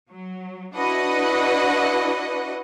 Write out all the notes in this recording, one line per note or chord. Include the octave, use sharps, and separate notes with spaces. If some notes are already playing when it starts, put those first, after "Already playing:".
F#3
D4 E4 F#4 B4 D#5 F#5